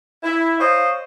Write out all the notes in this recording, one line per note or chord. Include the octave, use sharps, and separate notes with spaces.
E4
C5 C#5 D#5 F5